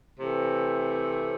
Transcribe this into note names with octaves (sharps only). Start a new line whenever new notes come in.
C3 E3 A3 C4